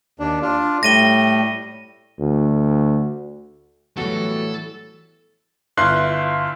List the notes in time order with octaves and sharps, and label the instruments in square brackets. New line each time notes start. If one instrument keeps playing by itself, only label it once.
[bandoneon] D#2 D4
D4 F4
[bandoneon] A2 G3 A3 [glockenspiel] A#6 D#7 G7
[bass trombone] D2
[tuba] A2 [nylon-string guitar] E3 F#3 [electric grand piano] G3 B3 F#4 [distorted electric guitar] A4
[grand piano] G1 E4 F4 C6 F#6 C7